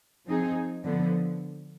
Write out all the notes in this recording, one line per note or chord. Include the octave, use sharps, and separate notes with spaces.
F3 C4 D#4 G#4
D3 F3 B3